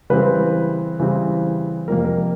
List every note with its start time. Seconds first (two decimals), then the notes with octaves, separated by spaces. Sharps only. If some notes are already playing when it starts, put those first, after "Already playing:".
0.10 C#3 E3 G3 C4 B4
1.00 C#3 E3 G3 C4
1.88 F2 C3 F3 A#3 A#4
2.05 A#4